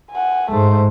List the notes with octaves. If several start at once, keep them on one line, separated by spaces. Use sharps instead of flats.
F#5 G#5
G#2 A3 C5